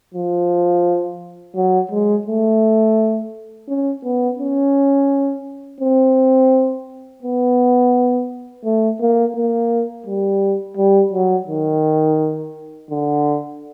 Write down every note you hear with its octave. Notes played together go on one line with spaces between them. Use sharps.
F3
F#3
G#3
A3
C#4
B3
C#4
C4
B3
A3
A#3
A#3
G3
G3
F#3
D#3
D3